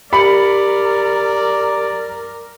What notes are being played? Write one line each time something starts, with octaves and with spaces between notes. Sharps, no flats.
G4 A#4 D5 B5 C#7 F#7